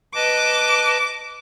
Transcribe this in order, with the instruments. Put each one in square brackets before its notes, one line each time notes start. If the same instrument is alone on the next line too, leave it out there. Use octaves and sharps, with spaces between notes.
[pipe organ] B4 D#5 A5 [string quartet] D6